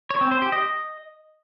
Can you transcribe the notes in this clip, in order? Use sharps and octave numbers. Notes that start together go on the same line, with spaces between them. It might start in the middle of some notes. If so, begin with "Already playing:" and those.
C#5
C4
C5
G4
D#5